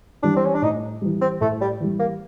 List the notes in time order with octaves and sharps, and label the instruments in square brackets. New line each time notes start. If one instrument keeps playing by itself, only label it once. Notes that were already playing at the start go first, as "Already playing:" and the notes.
[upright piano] E3 G3 [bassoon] D4
[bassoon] C4
C#4
D4
[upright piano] A2 [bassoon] D#4
[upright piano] E3 G3
[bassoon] C4
[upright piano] A2 [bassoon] A3
[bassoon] G3
[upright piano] E3 G3
[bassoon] A#3